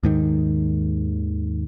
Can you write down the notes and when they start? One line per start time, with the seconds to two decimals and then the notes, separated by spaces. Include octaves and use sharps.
0.03 D#2 G#2 D#3